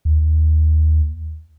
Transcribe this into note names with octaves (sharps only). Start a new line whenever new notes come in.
D#2